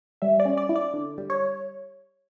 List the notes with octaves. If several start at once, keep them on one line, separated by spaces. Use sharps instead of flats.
G3 E5
D5
C#4
D5
E4
D5
D3
G3
C#5